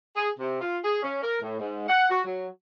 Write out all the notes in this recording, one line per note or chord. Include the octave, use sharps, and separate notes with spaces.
G#4
C3
F4
G#4
C#4
A#4
A2
G#2
F#5
F#4
F#3